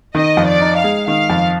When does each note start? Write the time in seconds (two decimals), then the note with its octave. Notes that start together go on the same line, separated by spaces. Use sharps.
0.15 D#3 D#5
0.37 F2
0.46 D5
0.61 D#4
0.76 F5
0.84 G#3
1.07 D#3 F5
1.30 F2